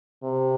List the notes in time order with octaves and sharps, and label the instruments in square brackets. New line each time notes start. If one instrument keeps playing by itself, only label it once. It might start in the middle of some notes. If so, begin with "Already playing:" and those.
[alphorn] C3